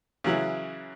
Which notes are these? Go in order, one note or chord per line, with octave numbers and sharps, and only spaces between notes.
C#3 E3 F#3 E4